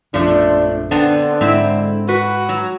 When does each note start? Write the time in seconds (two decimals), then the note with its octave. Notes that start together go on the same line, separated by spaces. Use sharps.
0.14 A#1 F#2 F3 A3 C#4 D4
0.91 D3 B3 C4 D4
1.41 G#2 G#3 C4 E4
2.08 F#4 B4
2.49 F#3